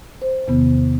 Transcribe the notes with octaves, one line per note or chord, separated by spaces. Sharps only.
C5
E2 C3 D#3 B3